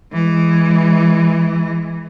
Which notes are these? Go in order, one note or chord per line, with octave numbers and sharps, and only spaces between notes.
E3 G#3